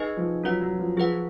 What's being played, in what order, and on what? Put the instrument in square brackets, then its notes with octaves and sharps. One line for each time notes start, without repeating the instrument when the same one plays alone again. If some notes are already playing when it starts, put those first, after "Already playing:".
Already playing: [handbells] D#4 G#4 B4 D#5 G#5
[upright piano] F3
[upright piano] F#3 [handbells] C#4 F4 B4 F#5
[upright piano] F#3
F3
[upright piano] F3 [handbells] G#4 B4 F#5